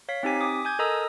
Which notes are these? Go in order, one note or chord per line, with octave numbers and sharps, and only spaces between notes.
C#5 F5 B6
C4 D#4 G4 G#5 B6
D6 D#6
G#5 G6 G#6
A4 A#4 D#5 A#5 D#6 E6